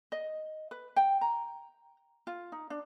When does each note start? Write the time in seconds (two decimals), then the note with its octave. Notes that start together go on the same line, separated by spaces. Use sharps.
0.12 D#5
0.71 B4
0.96 G5
1.21 A#5
2.27 F4
2.52 D#4
2.70 D4